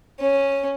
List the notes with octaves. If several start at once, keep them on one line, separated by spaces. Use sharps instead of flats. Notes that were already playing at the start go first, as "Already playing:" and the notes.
C#4